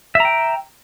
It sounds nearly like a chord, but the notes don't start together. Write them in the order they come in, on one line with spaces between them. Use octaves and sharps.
E5 A#5 G5